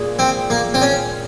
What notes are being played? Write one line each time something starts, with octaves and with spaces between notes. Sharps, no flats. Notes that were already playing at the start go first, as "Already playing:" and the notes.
Already playing: A#2 G#3
C4
A#3
C4
C#4